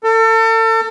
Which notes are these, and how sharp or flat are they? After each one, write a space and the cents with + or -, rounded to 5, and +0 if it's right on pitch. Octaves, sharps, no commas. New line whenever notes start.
A4 +35